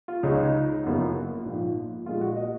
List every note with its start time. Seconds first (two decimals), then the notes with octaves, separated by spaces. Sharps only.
0.08 F4
0.23 C#2 C#3 G#3 C#4 D#4
0.84 F#1 F#2 F3 B3
1.45 A#1 G#2 F3
2.06 A#1 A#2 G#3 F4
2.21 F#4
2.36 D#5